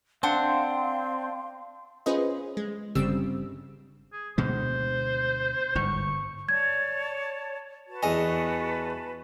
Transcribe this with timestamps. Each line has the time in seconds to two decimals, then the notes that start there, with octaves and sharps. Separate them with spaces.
0.23 C4 D4 C5 F5 F#5 C6
2.06 C#4 F4 G#4 B4 C5 D#5
2.57 G#3
2.95 G1 C#3 G3 C4 E6
4.12 G#4
4.38 D2 B2 G#3 C5
5.75 G1 G#2 C#6
6.49 C#5 D5 A5 G#6
7.87 F#4 B4 A5
8.03 E2 D#5 G#5